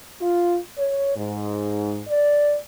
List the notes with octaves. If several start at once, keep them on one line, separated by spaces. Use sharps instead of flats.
F4
C#5
G#2
D5